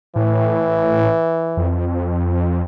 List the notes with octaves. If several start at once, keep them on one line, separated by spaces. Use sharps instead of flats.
A2 E3
F2